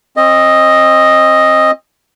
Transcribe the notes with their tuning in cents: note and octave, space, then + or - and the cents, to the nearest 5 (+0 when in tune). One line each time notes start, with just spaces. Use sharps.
C4 +35 D#5 +0